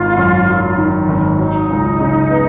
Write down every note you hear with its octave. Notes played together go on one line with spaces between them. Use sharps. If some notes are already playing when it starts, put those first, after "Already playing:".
Already playing: G#1 D#3 F4
F#2
F#3
D#3
G#1
F#3 D#4
C#2
C#3
B3